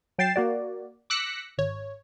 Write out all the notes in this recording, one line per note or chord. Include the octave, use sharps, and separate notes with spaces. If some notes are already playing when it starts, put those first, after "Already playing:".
F#3 G5 A6 C7 E7
A#3 F#4 D5
D6 E6 F#6 A#6 B6 C#7
G#1 C#5